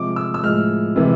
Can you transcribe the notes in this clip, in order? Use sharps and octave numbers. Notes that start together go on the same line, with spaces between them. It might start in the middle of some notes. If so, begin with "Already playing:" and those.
Already playing: C3 F3 G#3 D6
E6
E6
A2 F3 G#3 F6
C3 E3 G#3